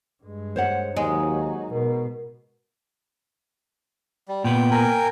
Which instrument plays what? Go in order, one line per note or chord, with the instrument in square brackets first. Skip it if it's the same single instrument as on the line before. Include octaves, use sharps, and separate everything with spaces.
[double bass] G2 G#3
[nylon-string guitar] C5 C#5 F#5
[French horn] D#2 [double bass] F#3 D#4 [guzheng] G#3
[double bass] B2 [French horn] A#4
[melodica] G3
[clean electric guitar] A#2 B3 [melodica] G5
[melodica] A#4 G5 G#5